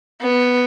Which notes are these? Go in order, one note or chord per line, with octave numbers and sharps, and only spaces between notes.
B3